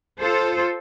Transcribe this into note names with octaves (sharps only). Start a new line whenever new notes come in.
F4 A4 C5